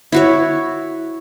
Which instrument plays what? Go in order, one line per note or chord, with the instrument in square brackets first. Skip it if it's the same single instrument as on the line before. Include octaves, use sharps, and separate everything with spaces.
[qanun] E4 F#4 C#5